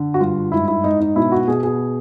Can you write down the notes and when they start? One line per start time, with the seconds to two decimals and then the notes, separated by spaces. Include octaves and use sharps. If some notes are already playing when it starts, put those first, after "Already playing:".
Already playing: D3
0.14 F#4
0.20 G2 F4
0.52 G#2 E4
0.68 E4
0.84 G#2 D#4
1.00 D#4
1.16 B2 E4
1.32 F#4
1.48 B2 G#4
1.63 G#4